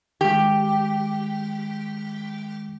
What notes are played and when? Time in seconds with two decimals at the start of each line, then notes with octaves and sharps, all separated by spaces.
0.21 D#3 G#3 G4